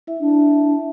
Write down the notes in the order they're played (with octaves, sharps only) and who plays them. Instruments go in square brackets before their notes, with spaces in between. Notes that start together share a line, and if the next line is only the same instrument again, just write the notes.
[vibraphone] E4 E5
[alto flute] D4